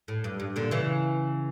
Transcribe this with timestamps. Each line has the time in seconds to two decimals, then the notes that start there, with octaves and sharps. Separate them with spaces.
0.08 A2
0.24 G2
0.40 G2
0.56 A#2 D3
0.71 C#3 E3